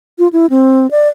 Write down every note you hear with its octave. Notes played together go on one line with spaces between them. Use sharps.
F4
E4
C4
D5